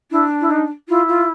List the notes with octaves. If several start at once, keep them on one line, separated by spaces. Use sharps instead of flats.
D4 E4
E4
D#4
E4 F4
F4